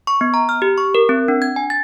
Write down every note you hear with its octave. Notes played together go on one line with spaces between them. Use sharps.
C#6
B3
A#5
F6
G4
C#6
A#4
C4
D4
G#6
G#5
A6